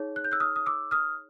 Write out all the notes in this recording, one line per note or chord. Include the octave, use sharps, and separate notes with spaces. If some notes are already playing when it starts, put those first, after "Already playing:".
Already playing: D#4 G#4 C#5
F#6
G6
E6 F#6
D#6 F6
D#6
D6 E6
D#6 F6